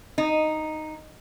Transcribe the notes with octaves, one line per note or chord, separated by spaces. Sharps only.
D#4